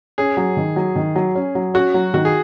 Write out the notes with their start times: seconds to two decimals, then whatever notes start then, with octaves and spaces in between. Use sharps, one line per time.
0.18 C#4 G#4
0.37 F#3
0.57 D#3
0.76 F#3
0.96 D#3
1.16 F#3
1.35 C#4
1.55 F#3
1.74 C#4 F#4
1.94 F#3
2.14 D#3 F#4
2.25 G#4